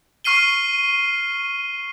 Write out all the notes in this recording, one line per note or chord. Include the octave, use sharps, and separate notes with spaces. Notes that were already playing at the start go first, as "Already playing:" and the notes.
C#6 F6 C7 D#7 G7